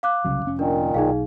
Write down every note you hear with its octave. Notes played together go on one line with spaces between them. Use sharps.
F5 D6 F#6
C2 C#3 F#3
F1 C#4
A#2 D#3 D4 A#4
B1 D#4 G#4 F5